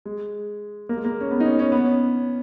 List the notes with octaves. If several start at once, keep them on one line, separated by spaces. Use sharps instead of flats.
G#3
A#3
G#3
A#3
C#4
B3
D#4
C#4
C#4
B3
C#4